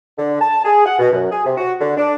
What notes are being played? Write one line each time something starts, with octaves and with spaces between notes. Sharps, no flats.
D3
A5
G#4
F#5
B2
F#2
G#4
C3
F#4
D3
D4